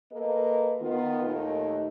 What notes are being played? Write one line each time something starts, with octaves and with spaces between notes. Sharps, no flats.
A#3 A4 B4 D#5
D#3 B3 F4
D#2 A#2 A3 D#4